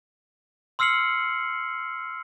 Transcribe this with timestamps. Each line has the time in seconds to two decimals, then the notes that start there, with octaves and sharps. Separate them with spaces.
0.79 C6 E6 F6 C7 C#7 F#7